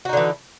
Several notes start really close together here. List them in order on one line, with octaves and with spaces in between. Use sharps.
F#4 D#4 D3 E3